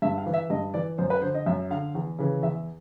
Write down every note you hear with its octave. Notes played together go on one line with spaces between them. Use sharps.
G2 E5
F5
E3
E5
G2 D#5
E3 D5
F#2 C5
B4
D3 C5
D#5
F#2 E5
D3 F5
E2
C#3 E3
E2 E5